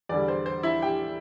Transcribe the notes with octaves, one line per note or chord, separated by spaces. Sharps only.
E2 D3 G3 D5
C5
C5
E4 E5
G4 G5